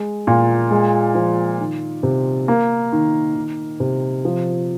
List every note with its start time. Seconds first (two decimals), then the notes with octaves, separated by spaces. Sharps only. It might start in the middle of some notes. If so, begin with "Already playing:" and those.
Already playing: G#3
0.27 A#2
0.71 G#3
1.15 F3
1.60 D#3
2.03 C3
2.48 A#3
2.92 D#3
3.36 D#3
3.80 C3
4.25 F3